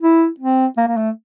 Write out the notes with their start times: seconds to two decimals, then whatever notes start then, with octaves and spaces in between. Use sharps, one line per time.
0.01 E4
0.40 C4
0.77 A#3
0.87 A#3
0.97 A3